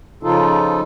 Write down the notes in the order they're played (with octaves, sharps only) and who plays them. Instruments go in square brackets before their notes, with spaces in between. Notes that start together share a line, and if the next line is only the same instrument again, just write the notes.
[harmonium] C#3 F3 D#4 F4 A4